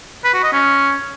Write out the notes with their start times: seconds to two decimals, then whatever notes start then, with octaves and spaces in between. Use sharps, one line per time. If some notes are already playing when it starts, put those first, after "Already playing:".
0.24 B4
0.34 F#4
0.43 D#5
0.53 C#4